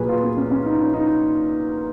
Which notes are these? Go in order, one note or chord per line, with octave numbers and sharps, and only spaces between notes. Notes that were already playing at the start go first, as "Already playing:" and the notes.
Already playing: A#2 F#3 G#4 B4
F4
B3
C#4
C#4
D#4
C#4
D#4